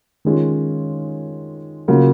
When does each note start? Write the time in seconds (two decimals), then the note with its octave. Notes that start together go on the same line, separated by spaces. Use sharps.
0.25 D#3 G#3 C#4 F4
1.88 C#3 F#3 A#3 F4